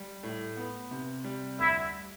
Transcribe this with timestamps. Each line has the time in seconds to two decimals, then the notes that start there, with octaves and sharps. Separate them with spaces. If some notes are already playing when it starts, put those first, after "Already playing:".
Already playing: G3
0.23 A2
0.57 B3
0.91 C3
1.24 G3
1.59 D2 E4